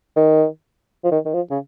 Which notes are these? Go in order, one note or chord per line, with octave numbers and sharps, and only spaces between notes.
D#3
F3
D#3
D#3
F3
C#3